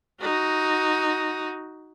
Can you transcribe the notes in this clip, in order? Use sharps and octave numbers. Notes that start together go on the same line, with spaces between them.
D#4 F#4